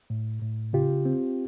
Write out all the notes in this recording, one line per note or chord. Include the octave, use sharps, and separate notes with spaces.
A2
A2
C#3 F4 G4
C4